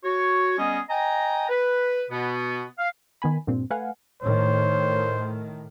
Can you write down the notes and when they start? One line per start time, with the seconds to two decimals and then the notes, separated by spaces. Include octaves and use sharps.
0.04 F#4 C#5
0.58 G3 B3 C#4 G#4 D#5
0.89 D#5 G5 G#5 A#5
1.49 B4
2.10 B2 B3
2.79 F5
3.22 D#3 B3 G#5 B5
3.47 G2 A#2 C4
3.70 A3 B4 F5 F#5 G#5
4.22 A2 D#3 C5 C#5